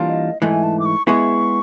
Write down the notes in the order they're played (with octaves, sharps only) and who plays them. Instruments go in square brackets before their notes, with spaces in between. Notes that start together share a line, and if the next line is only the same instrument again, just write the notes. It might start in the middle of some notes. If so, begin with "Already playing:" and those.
Already playing: [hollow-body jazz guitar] E3 G3 A#3 D4 F4
[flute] D#5
[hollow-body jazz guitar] G#2 E3 A3 [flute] G#5
[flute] A5
D6
C#6
[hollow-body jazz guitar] G#3 B3 E4 G#4 [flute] C#6